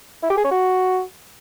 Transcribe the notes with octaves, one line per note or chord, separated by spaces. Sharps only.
E4
G4
G#4
C#4
F#4